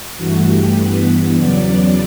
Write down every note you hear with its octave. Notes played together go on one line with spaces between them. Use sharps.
G2 E3 A3 F#4
G4
G2 E3 B3 B4
E2 C#3 F#3 B3 D5